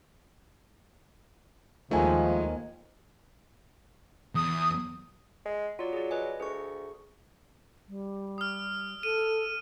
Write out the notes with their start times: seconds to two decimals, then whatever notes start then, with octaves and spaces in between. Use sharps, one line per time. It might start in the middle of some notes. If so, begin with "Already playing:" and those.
1.91 D#2 D#3 F3 G#3 A3 G#5
4.35 E2 D#6
5.46 G#3
5.79 F#3 F4 D5
5.93 G#4 D5
6.11 B4 D#5 G#5
6.40 D2 G#4 C#6
7.89 G3
8.38 D#6 F6
9.03 A4 D#7